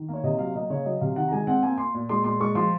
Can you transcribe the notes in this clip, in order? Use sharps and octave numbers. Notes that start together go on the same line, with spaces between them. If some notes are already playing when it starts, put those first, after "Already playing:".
Already playing: D#3
A#3 C#5
C3 D#5
F#3 F5
A#3 D#5
C#3 C#5
F#3 D#5
C3 F5
D#3 F#5
A#5
G#3 G#5
C4 F#5
A#3 G#5
A#3 C6
A#2
G#3 C6
A#2 C6
G#3 C#6
F3 C6